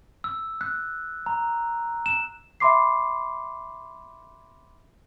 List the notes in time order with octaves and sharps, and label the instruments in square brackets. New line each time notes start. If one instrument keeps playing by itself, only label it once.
[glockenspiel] E6
F#6
A#5
E7
[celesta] E5 B5 C6 D6 C7